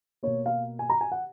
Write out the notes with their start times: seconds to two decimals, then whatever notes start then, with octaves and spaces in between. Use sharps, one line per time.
0.23 B2 A#3 C#5
0.46 F5
0.79 G#5
0.90 A#5
1.01 G#5
1.12 F#5